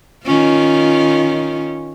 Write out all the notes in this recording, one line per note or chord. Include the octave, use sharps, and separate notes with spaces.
D#3 C#4 F4